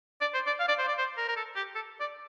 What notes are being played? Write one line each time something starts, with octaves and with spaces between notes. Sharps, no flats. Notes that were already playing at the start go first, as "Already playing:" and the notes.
D5
C5
D5
F5
D5
C5
D5
C5
A#4
A#4
A4
G4
A4
D5